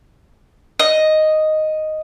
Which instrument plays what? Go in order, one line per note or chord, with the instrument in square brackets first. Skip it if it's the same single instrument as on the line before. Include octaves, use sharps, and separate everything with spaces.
[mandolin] D#5